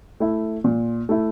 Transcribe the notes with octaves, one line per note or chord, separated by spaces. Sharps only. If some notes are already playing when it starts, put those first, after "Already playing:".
A3 E4
A#2
A3 E4